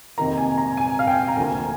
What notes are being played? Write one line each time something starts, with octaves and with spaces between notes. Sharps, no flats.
F2 C3 D#3 A#3 A#5
G#5
A#5
G#5
F5
G5
A#5
D2 D3 F3 A#3 G#5